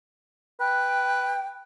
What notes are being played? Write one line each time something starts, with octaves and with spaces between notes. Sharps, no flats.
B4 G5